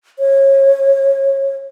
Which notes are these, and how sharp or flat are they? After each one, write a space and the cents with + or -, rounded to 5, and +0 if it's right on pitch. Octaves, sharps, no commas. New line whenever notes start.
C#5 -25